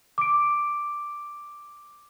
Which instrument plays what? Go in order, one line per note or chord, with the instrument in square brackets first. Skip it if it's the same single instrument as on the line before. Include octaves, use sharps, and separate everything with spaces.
[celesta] D6 D7